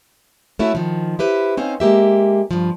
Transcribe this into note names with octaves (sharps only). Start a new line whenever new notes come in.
A3 C#4 E4 F#4
D#3 F3
E4 G4 B4 C5
C4 C#4 D#4 F5
G#3 A#3 G4 E5
G2 F3